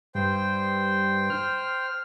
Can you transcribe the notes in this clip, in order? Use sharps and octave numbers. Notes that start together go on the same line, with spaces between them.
G2 C5 G5
F6